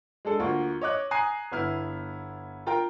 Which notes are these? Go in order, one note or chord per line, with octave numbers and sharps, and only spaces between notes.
G#3 D4 A4
D2 A#3 F4 C#6
C#5 D#5 D6 F#6
G#5 A#5 D#6 F#6 C7 D#7
G1 B3 E4 F6
F4 A#4 G5 A#5